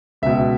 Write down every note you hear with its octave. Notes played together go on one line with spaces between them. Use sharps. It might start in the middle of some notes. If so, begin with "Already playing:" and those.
C#2 B2 E5